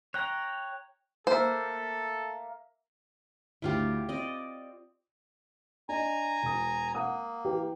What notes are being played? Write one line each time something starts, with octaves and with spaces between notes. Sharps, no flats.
C#5 G5 A#5 F#6
A#3 A4 C5 E5
D2 A2 D3 E4 F4 G4
C4 D5 D#5
D4 D#5 G#5 A#5
E1 D#6
A#3 F#5 D#6
E3 G4 B4